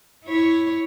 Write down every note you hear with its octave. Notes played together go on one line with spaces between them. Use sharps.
E4 C#5